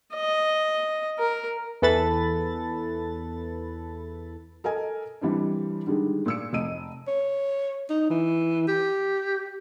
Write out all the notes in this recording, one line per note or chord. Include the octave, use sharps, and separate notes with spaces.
D#5
A#4
E2 E3 A4 B4 B5 A6
A4 A#4 D#5 G#5
E3 G3 C4 D4
D3 D#3 G3 G#3
A#2 E6 C#7
F1 D#5 E6 D#7
C#5
D#4
E3
G4